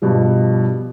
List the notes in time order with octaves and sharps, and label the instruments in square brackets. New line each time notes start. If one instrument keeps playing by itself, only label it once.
[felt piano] G2 B2 F3 G3